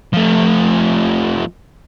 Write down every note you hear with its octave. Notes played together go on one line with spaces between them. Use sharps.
F3 A3